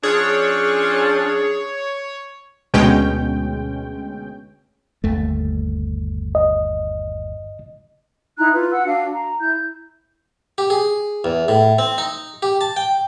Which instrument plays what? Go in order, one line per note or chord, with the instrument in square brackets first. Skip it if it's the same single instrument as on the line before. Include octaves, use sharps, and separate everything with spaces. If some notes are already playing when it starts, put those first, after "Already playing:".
[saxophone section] F3 C#4 D4 [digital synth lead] G#4 [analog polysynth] C#5
[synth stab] D2 B2 G#3 C#4 G5
[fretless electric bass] G1 D#2 A3
[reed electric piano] D#5
[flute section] D#4 E4 A#5 F#6
F4 B4
F#5 E6
D4 F#4 F5
A#5
E4 G6
[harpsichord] G4
G#4
E2
A2
C4
D#4
G4
A5
G5